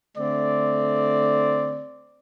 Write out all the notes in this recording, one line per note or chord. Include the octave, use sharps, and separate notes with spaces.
D3 A3 C4 D5